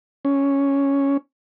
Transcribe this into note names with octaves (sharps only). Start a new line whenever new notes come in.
C#4